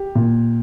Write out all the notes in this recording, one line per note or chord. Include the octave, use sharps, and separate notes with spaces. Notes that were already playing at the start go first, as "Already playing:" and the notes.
Already playing: G4
A#2